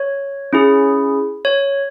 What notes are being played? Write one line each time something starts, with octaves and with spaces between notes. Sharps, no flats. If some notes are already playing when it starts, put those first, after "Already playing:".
Already playing: C#5
C#4 E4 G#4
C#5